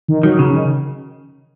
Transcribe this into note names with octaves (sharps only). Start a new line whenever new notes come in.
D#3
D#3 F#3
C#3
D#3